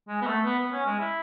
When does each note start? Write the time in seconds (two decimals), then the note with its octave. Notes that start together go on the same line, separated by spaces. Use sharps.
0.08 G#3
0.21 B3
0.27 A3
0.45 B3
0.59 B3
0.72 C#4
0.86 G#3
0.99 E4